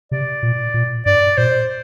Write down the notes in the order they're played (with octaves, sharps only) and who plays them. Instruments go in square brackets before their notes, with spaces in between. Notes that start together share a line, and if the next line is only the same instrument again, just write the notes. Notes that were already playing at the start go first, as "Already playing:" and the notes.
[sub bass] C3 [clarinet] D5
[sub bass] A#2
A#2
[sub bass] G2 [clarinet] D5
[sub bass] A#2 [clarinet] C5